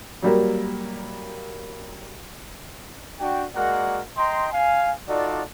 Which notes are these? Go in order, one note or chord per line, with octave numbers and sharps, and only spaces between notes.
F#3 G3 A#3
D4 F#4 G5
G#3 A#3 F#4 A#4 D5 F#5
D#5 G5 A#5 C6
F5 G#5
D#4 F4 F#4 A4 D5